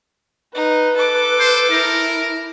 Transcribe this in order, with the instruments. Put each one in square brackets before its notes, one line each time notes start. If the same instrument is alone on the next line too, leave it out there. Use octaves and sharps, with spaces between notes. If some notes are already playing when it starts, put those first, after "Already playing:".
[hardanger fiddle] D#4 [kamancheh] B4
[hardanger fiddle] A4 D6
[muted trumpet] C5
[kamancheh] E4 [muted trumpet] A#4